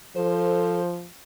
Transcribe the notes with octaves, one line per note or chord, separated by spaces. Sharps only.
F3 A4 C5